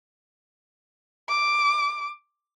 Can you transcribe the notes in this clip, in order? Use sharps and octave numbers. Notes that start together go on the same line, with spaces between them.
D6